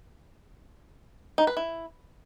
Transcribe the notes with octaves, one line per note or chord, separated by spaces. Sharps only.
D#4
B4
E4